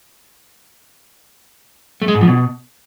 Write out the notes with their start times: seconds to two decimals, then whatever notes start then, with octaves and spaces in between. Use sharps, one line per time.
2.02 A3
2.08 G#3
2.15 G#2
2.21 F3
2.28 B2